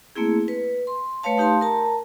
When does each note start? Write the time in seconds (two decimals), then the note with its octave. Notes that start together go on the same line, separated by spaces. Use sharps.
0.16 A3 A#3 C4 E4 G#4
0.48 B4
0.87 C6
1.23 A3 B4 C#5 F5 A5
1.37 A3 D#4 G4 F5 A5 C6
1.61 A#4 A5 A#5